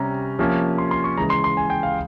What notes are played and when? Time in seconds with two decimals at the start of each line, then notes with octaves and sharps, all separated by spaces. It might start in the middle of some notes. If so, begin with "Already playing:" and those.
Already playing: C3 G3 C#4 A#5
0.39 C3 F3 A#3 C#4
0.78 C6
0.91 C6
1.04 C#6
1.17 C#3 E3 G#3 A#5
1.30 C6
1.44 C6
1.57 G#5
1.70 G5
1.83 F5